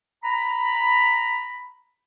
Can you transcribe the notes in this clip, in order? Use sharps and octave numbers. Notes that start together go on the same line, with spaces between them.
A#5 B5